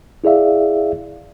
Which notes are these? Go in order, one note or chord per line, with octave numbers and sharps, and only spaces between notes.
E4 G#4 D5 E5 F5